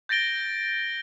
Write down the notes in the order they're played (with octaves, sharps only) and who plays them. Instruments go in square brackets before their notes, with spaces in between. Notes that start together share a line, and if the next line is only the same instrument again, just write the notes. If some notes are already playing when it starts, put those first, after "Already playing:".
[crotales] G6 A6 A#6 D7 G7